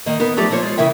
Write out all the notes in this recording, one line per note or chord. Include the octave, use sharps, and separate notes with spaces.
D#3 A#3 D#5
B3 D#4 A#4
F3 F#3 A3 G4 A4 D5
F3 A#3 A4 C5 C#5
G#3 F4
C#3 E3 E4 A#4 E5 G5